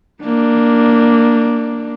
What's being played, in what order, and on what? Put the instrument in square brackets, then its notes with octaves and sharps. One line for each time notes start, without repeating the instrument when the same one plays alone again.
[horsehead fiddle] A#3 D4